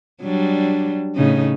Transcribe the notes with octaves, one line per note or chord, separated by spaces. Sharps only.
F#3 G3 D4
A2 C#3 D#4